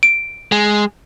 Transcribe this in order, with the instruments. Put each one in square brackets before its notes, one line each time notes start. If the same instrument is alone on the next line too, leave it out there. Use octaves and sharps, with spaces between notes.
[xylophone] D7
[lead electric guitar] G#3